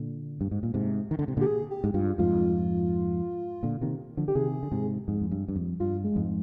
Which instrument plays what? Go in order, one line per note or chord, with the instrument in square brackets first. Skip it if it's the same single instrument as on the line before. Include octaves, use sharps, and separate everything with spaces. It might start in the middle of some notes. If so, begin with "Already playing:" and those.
Already playing: [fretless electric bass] A#2 D3
G2
G#2
A#2
G#2 C3
D#3
D3
C3
A#2 D3
[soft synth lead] G4
G#4
G4
[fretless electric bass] G#2
[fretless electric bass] G2 [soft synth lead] F4
[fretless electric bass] F2 G#2 [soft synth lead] F4
[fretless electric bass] A#2 D3
C3 D#3
D3 F3
[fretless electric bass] D3 [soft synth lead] G4
[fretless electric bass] C3 D#3 [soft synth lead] G#4
[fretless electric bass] D3
G#2 C3
F2 G#2
F2
G2
G2
F2
[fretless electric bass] G2 [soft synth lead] F4
[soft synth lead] G#3
[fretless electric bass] F2 G#2